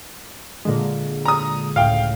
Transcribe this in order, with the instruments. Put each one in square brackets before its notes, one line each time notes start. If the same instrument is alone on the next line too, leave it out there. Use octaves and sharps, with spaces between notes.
[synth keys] A#2 D3 G#3
[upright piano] A#5 D#6
[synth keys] C#2 A2 [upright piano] F5 G5